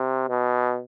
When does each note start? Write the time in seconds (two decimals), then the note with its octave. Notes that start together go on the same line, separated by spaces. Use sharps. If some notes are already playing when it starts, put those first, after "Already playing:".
Already playing: C3
0.29 B2